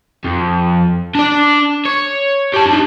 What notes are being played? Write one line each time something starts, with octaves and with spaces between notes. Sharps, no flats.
F2
D4 D5
C#5
G4 A5
D4 D#4